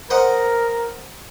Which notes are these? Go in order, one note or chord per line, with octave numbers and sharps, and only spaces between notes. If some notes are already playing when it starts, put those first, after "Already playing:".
A#4 C5 D#5 F#5